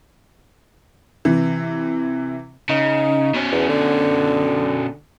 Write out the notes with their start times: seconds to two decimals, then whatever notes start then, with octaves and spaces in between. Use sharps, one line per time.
1.25 C3 E3
2.69 C#3 D#4
3.34 B2 C#4
3.52 E2
3.68 D3